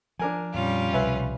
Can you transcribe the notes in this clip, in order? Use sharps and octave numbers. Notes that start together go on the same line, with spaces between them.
F3 D4 A#4 G#5
F2 A#2 G3 C#4 F4
C2 B2 F3 B4 E5 G#5